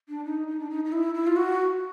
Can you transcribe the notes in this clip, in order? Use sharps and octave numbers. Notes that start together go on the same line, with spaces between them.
D4
D#4
D#4
D4
D#4
D#4
E4
E4
F4
F#4